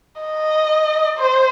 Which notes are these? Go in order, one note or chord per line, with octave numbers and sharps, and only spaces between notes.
D#5
C5